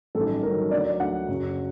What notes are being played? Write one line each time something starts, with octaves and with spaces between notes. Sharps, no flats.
A1 G2 D#3 F#3 A4
A1 G2 D#3 F#3 A#4
D2 D3 F#3 D5
D5
D2 D3 F#3 F#5
F#1 F#2 F#3